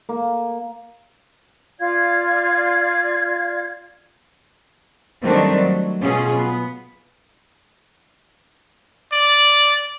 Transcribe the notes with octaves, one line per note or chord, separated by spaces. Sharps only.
A#3
F4 D5 F5 G#6
D#3 F#3 G3 A3 C4 D4
F#3
B2 F#3 C#4 F4 G#4
B3
D5